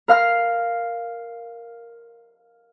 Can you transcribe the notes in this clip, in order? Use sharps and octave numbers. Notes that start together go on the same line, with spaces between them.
A#4 F5 F6